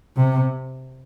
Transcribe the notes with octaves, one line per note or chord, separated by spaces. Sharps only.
C3